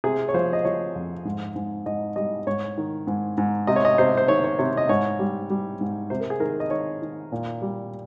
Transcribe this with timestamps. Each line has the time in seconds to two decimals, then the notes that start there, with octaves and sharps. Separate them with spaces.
0.04 C3 G#4
0.28 C#5
0.34 F3 C5
0.53 D#5
0.65 F3 C#5
0.96 F2
1.25 G#2
1.55 G#2
1.86 G#2 D#5
2.16 G3 D#5
2.47 G#2 C#5
2.78 D#3
3.07 G#2
3.38 G#2
3.67 C3 D#5
3.76 C#5
3.85 D#5
3.98 C3 C5
4.17 C5
4.28 D#3 C#5
4.44 C#5
4.59 C3 C#5
4.77 D#5
4.89 G#2 C#5
5.19 G3
5.50 G3
5.81 G#2
6.10 C3 C5
6.20 A#4
6.30 G#4
6.40 D#3 A#4
6.60 D#5
6.70 D#3 C#5
7.02 D#3
7.32 A#2
7.62 G3